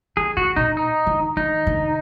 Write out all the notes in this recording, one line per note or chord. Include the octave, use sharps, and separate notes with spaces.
D#3 G#4
D3 F#4
A#2 D#4
D#4
D3
D#3 D#4
D3